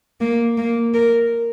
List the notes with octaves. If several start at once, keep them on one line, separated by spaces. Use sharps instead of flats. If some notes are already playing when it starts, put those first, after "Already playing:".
A#3
A#3
A#4